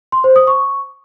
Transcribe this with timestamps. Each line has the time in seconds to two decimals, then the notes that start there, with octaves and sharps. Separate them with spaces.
0.12 C6
0.24 C5
0.36 D#6
0.47 C#6